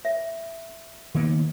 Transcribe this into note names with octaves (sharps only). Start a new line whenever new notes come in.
E5
D#3 A#3 B3